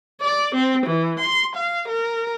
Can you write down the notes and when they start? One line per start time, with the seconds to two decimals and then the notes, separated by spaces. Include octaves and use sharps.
0.22 D5
0.55 C4
0.86 E3
1.20 C6
1.56 F5
1.88 A#4